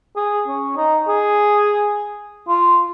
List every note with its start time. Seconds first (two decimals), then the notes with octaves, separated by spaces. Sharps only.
0.16 G#4
0.47 C#4
0.77 D#4
1.08 G#4
2.48 F4